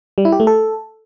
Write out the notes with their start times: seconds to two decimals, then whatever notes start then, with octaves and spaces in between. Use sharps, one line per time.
0.18 G3
0.25 E4
0.32 G4
0.40 A3
0.47 A4